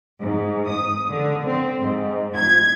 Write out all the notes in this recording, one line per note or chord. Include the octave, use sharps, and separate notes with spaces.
G#2
D#6
D3
C4
G#2
G#6